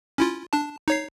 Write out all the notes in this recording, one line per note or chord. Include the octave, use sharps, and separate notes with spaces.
C#4 E4 F4
D4 A5
D#4 C#5 C7